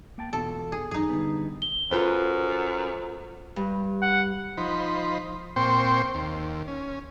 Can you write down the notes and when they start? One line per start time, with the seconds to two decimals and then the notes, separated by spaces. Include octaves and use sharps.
0.18 A#3 G5 A5
0.33 E2 B2 F4 A4
0.72 G#4
0.91 F#2 D#3 D#4 G#4
1.10 D3 G3 B3
1.62 G7
1.91 F#2 F4 A4 B4 C5
3.56 G2
4.02 F#5
4.57 F3 D#4 C5 B5
5.56 A#2 C4 C5 G5 C6 C#6
6.15 D#2
6.68 C#4